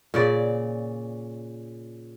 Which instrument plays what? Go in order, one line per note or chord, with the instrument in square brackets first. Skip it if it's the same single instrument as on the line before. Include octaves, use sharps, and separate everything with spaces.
[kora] A#2 C#3 D5